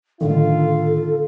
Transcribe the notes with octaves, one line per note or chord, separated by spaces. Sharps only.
A2 D3 D#3 F4 A4